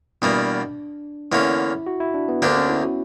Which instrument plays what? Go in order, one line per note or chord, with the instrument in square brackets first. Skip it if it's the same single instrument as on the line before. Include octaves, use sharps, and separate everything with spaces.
[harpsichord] E2 B2 G3 A#3 [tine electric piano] D4
[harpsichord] E2 D3 A#3 C#4 [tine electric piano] E4
[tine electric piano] F#4
E4
D4
B3
[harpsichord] D2 D3 A#3 D4 G4 [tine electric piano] B3
[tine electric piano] C#4
E4
F#4